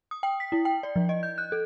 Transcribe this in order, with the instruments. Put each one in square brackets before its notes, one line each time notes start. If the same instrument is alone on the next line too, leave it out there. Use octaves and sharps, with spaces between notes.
[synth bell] D#6
G5
B6
E4
G5
D5
F3
D#5
G6
F#6
A4